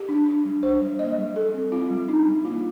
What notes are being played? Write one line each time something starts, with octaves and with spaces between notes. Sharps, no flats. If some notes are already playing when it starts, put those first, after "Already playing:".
Already playing: G4
D4
D4
G3
D4 C5
G3
A#3 D#5
G3
G3 A4
C4
C4 F4
G3
D4 D#4
G3
A#3 F4